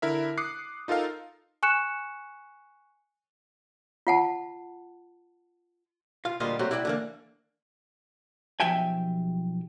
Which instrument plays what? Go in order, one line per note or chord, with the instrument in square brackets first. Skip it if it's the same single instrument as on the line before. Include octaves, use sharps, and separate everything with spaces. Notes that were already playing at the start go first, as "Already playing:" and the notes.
[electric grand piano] D3 E4 A#4 E5
D6 D#6 F#6 C7 C#7
D#4 F4 A4 A#4 F5
[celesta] G#5 C#6 F#6 C#7 E7
[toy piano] F4 F#5 A5
[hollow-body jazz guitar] F4 F5
D2 A#2 G3 F4 D#5
F#3 A3 C4 F#4 G4
E4 F#4 D5 D#5 G5
D3 E3 A#3
B1 F3 G4 E5 G5 G#5